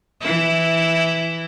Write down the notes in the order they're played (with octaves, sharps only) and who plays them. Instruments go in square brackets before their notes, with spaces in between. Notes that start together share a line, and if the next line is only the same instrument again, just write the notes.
[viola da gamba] E3 E4